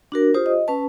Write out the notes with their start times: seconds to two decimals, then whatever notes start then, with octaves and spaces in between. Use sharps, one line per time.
0.12 D4 F#4 A#4
0.34 F4 G4 C5 D#6
0.46 D#5
0.68 C#4 B4 A5